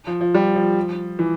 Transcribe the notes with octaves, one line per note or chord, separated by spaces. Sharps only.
F3
F3
G3
F3
E3